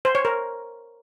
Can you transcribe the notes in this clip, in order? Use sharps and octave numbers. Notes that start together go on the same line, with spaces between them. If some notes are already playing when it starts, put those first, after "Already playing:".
C5
C#5
A#4